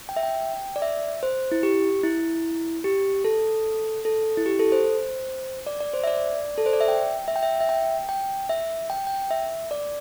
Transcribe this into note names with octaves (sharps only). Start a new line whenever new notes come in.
G5
E5
G5
D5
E5
C5
E4
G4
E4
G4
A4
A4
E4
G4
A4
C5
D5
D5
C5
E5
D5
A4
C5
D5
E5
G5
E5
G5
E5
E5
G5
G5
E5
G5
G5
E5
D5